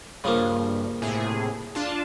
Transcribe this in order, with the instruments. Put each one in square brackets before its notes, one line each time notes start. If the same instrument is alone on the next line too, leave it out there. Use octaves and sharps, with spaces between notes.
[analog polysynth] G2 [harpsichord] C#3 F3 A#3
[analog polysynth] A2 C3 G#4
D4 F4 A5